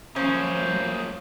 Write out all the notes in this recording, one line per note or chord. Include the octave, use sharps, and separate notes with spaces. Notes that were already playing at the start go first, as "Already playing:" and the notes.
F3 F#3 A3 A#3 C#4 G#4 C5